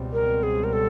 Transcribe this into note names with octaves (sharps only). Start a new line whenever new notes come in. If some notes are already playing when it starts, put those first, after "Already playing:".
Already playing: C#2 B2 G3 C4
A#4
G#4
A#4
A4